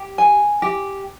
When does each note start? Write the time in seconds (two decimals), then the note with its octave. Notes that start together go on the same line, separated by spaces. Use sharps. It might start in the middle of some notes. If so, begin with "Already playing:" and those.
Already playing: G4
0.18 G#5
0.62 G4